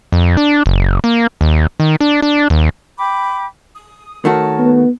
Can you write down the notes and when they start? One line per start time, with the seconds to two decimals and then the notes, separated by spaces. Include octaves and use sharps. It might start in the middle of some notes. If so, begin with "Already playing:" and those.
0.12 F2
0.37 D4
0.66 F#1
1.04 A#3
1.41 D#2
1.80 D#3
2.01 D4
2.22 D4
2.50 D#2
2.98 G5 B5 D6
3.74 D#6
4.25 D#3 A3 F#4 A#4 C#5 A5
4.59 B3